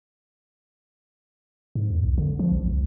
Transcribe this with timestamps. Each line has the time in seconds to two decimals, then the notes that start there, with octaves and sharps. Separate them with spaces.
1.75 G#2
1.90 E2
2.04 B1
2.18 D3
2.39 F3
2.52 A#1
2.66 C#2